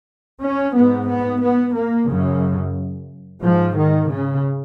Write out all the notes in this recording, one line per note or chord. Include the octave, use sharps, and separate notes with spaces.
C#4
G#2 B3
B3
B3
A#3
F#2 C#3
G#2 F3
D#3
C#3